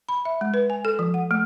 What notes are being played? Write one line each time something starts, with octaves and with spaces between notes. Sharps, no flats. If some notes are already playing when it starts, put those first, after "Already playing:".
B5
E5
G#3
B4
G#5
A4
F3
F#5
A3